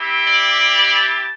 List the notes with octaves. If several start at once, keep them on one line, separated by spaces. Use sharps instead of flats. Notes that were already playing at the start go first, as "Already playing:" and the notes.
Already playing: C4 E4 G4
D5
A5